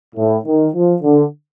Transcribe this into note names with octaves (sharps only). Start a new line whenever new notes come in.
A2
D#3
F3
D3